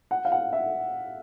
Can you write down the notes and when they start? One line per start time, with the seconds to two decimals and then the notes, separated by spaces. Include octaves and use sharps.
0.11 F#5
0.25 F5
0.32 F#5
0.53 E5